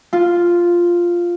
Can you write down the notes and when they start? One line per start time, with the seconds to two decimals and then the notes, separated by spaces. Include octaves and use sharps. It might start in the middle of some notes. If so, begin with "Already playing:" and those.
0.13 F4